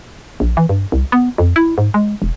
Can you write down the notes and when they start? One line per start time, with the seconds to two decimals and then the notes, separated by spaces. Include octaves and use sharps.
0.40 A#1
0.57 E3
0.69 G2
0.92 C2
1.12 B3
1.38 F2
1.56 E4
1.78 G#2
1.94 G#3
2.22 E1